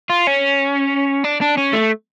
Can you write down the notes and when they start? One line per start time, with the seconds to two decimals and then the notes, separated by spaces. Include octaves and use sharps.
0.10 F4
0.27 C#4
1.24 D4
1.41 D4
1.57 C#4
1.73 A3